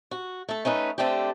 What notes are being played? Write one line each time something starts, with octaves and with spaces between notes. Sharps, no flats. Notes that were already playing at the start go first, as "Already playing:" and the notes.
F#4
A3 A4
A3 C#4 D#4 E4 B4
D3 A3 C4 D4 G4